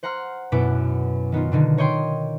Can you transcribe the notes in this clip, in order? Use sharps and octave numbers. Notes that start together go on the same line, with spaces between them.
C5 F#5 A#5 C6 F6
F#2 B2 B3 E4 D6 D7
D#3 B3 D#4 F4
B2 D3 D#3
A#4 C#5 D#5 G5 C6